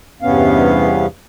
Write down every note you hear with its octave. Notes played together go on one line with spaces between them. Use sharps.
E2 G2 C3 B3 C#4 F5